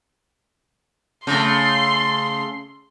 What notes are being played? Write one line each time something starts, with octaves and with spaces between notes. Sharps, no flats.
C#3 A3 C6